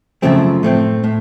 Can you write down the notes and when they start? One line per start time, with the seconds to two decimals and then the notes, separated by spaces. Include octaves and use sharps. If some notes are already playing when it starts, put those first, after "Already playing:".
0.22 F#2 C#3 F3 A3 C4
0.63 A2 A3 C4
1.04 A2